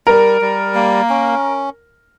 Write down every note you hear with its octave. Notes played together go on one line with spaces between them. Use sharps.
G3 A#4
G3
A#3
C#4